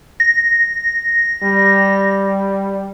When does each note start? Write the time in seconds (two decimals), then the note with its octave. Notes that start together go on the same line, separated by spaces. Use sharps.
0.20 A#6
1.43 G3